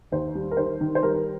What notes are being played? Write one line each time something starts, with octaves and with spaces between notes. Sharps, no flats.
D#2 C5
G3
A#4
D#3 C5
D#3
C5
G3 A#4